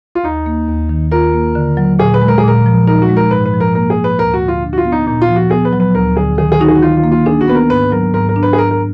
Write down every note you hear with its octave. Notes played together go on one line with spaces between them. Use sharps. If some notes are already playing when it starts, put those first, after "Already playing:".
F4
D#2 D#4
A#3
D#2
D#3
F4 A#4
A#3
D3
F#3
A#2 G#4
B4
G#3
A#4
G#4
A#2 A#4
F3
D#4 A#4
F#4
G#3
A#4
G#2 B4
B4
F3
A#4
A#3 A#4
G#4
F3
B4
D2 A#4
F#4
D3
F4
D4
F#4
F4
B3
D#4
A#2 D#4
F4
F3
F#4
B3 G#4
B4
F#3
B4
D2 A#4
D3 G#4
D#3 G#4
G#4
D#4 F#4
G#4
F#4
D#3 F4
F4
A#3
F4
D4 G#4
F#4
B3 B4
A#4
G#2 B4
F#3 A#4
G#2 A#4
A#4
D4
B4
G#4
G#2 A#4
A#4